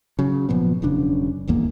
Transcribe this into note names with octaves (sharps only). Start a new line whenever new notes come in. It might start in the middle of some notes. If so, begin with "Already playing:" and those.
C#3 F#3
G#1 A#2 F3 B3
E1 F#2 C#3 D4
D#1 G#1 E2 A#3